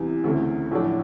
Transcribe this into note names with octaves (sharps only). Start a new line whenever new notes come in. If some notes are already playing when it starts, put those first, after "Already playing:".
Already playing: E2 C3 E3 G3
D2 C#3 E3 A3 C4
A#1 A2 F#3 A3 D4